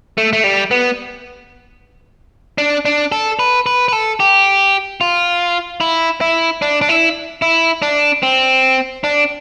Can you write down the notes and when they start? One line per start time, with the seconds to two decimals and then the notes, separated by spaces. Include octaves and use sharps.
0.18 A3
0.33 A3
0.44 G3
0.71 B3
2.58 D4
2.85 D4
3.12 A4
3.39 B4
3.66 B4
3.88 B4
3.92 A4
4.20 G4
5.01 F4
5.81 E4
6.21 E4
6.62 D4
6.82 D4
6.89 E4
7.42 E4
7.82 D4
8.23 C4
9.04 D4